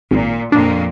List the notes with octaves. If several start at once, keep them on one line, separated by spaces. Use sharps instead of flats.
G#1 A#2
F2 A#2 A#3 D4